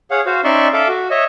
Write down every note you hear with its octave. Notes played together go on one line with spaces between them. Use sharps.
G#4 C#5 F5 F#5
F#4 C5 F5
C#4 D#4 D5 E5 C6 C#6
A4 E5 F5 D6
F#4
C#5 D#5 E5